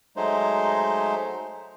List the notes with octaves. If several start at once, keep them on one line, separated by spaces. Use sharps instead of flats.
F#3 G#3 A3 D#4 C5